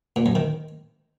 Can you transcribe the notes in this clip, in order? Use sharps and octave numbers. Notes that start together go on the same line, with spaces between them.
A#2
F#2
D#3